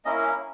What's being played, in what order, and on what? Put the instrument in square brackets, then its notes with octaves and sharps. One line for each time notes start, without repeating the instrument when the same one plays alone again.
[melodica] A#3 C#4 E4 D#5